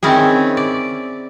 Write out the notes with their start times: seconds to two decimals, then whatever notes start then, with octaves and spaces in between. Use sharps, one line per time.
0.03 D#3 C4 C#4 E4 G#4
0.57 D5